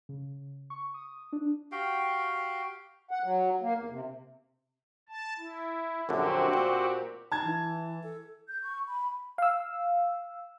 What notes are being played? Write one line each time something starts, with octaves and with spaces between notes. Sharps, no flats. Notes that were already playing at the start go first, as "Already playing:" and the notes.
C#3
C#6
D#6
D4
F#4 G4 F5 G5
F#5
F#3
A#3
E2
C3
A5
E4
A#1 F#2 D3 C4 F#4 G4
A#2
D#4 A5 G#6
E3
A4
G6
C#6
B5
F5 E6